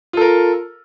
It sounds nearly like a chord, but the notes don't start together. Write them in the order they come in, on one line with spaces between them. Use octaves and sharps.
F4 A4 A#4